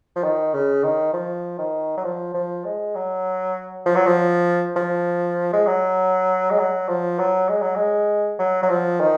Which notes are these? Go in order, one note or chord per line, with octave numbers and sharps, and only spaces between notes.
F3
D#3
C#3
D#3
F3
D#3
F#3
F3
F3
G#3
F#3
F3
F#3
F3
F3
G#3
F#3
G#3
F#3
F3
F#3
G#3
F#3
G#3
F#3
F#3
F3
D#3